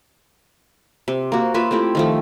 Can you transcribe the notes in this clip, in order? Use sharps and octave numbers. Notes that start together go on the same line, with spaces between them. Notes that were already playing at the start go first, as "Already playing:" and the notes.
C3
A#3 F#4
A#3 F4 B4 E5
A3 C4 E4 G4
D#3 F3 A3